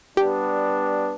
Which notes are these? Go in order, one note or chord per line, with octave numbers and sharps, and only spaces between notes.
G3 B3 D4 G4